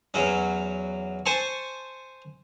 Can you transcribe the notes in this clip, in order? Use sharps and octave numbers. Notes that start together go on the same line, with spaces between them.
E2 F#3 C#4
C5 G#5 A5 C#6